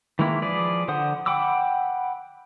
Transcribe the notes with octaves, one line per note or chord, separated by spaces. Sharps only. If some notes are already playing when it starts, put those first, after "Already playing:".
D#3 E3 G#3 A#3 E4
F3 G#4 B4 D5
D3 C5 F#5 D#6
F#5 G5 B5 D6 E6